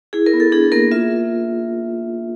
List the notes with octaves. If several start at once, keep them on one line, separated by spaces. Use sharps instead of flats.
E4 G#4
A#4
B3
A4
D4 G#4
A#3 A#4
F4 E5